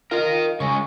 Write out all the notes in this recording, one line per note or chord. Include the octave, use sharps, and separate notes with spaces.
F4 A#4 D#5 F5
C#3 G#3 C#6